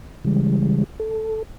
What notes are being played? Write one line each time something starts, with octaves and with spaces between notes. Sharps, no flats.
C#3 E3 G3 G#3
A4